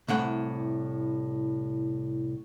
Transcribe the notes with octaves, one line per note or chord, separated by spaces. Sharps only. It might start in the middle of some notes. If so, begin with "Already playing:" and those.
C2 A2 F#5